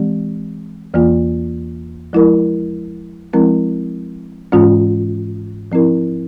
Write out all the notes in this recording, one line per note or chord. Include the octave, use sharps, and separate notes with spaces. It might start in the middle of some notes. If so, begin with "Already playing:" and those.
Already playing: E3 G#3 C4 G4
E2 E3 A#3 F4
F3 G#3 E4 A#4
F3 G#3 C4 E4 A#4
G#2 E3 G#3 C#4 F4
F3 C4 E4 A#4